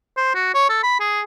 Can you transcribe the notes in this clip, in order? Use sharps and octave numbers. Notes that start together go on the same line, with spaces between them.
C5
F#4
C#5
A4
B5
G#4